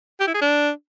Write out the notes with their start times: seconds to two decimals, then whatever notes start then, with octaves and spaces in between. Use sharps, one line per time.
0.20 G4
0.27 E4
0.34 G#4
0.42 D4